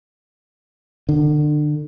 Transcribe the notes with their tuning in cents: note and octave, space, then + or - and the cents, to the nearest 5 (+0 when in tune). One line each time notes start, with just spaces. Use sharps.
D3 +30